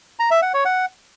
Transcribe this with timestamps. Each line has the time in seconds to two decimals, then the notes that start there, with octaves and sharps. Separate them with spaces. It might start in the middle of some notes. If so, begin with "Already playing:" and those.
0.19 A#5
0.31 E5
0.42 F#5
0.54 C#5
0.65 F#5